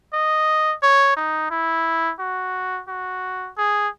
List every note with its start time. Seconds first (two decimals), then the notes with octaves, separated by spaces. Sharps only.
0.13 D#5
0.83 C#5
1.17 D#4
1.51 E4
2.20 F#4
2.88 F#4
3.58 G#4